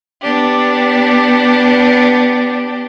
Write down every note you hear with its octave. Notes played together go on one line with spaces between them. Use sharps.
B3 D4 G4